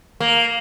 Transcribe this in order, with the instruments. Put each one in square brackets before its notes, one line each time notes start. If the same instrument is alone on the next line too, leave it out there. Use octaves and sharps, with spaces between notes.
[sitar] A#3